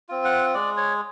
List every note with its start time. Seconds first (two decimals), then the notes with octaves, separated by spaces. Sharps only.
0.09 C4 F4
0.24 F#5
0.54 G#3 D5
0.77 C#5